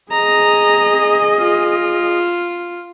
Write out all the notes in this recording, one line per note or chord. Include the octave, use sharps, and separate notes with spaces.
G#4 D#5 A#5
F4